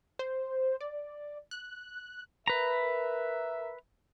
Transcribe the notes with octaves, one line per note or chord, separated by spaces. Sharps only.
C5
D5
F#6
A#4 B4 E5 A#5